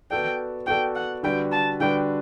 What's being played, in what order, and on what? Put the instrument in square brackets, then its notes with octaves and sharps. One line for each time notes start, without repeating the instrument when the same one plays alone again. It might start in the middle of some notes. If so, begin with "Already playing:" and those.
[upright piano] B3 F#4 A4 D5 [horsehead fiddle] G5
[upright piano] B3 F#4 A4 D5 [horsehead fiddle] G5
[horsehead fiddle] F#5
[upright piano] D3 G3 D4 F#4 B4 [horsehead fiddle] G5
[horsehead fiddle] A5
[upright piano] D3 G3 D4 F#4 B4 [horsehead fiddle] G5